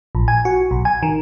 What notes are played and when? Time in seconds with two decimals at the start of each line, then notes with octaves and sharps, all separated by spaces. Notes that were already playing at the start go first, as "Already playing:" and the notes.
0.15 A#1
0.28 G#5
0.45 F#4
0.71 B1
0.85 G#5
1.03 D#3